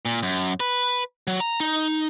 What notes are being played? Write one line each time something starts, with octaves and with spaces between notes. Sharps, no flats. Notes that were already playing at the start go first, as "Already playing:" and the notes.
A#2
F#2
B4
F#3
A#5
D#4